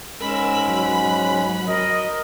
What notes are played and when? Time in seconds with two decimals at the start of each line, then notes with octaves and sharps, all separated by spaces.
0.21 G#2 G#3 C#4 A#4 B5 E6
0.68 F#3
1.67 A#4 D#5